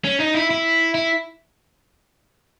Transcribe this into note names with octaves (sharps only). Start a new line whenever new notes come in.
C#4
D#4
E4
E4
E4